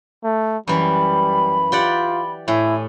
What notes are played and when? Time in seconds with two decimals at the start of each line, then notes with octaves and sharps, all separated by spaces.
0.24 A3
0.67 F#2 E3 G3 B5
1.72 F4 G4 D5 F#5
2.48 A2 E4 G#5